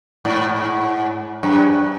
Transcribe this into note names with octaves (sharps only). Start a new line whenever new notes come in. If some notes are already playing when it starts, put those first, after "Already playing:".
G#2
F#2